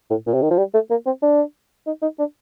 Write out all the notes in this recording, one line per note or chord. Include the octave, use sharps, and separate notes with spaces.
A2
A#2
C3
D#3
F3
G3
A3
A#3
C4
D4
D#4
D#4
D4